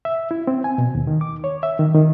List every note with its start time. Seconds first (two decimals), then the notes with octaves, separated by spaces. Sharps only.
0.05 E5
0.31 E4
0.47 C4
0.64 G#5
0.78 B2
0.95 D#2
1.07 D#3
1.21 D6
1.44 C#5
1.63 E5
1.79 D#3
1.95 D#3